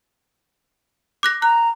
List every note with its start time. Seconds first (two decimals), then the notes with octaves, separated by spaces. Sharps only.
1.23 D6 F#6 A#6
1.42 A#5 F#6